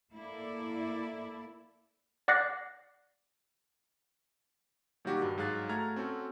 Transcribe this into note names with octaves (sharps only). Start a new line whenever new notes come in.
A#3 E4 A4 D5
D5 F#5 D6 F#6 A#6 C7
A#2 D#3 F#3 G3 F#4 G4
G2
G#2 F#3 G#4 F5 F#6 A6
A3 F#4 A#5 F6 G#6 A6
C4 C#4 F#4 A4